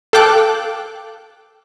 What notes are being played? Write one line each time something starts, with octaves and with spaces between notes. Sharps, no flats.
A4 F5 G5 D6 F#6